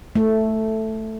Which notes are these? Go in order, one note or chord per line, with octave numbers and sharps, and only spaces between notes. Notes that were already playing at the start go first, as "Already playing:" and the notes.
A3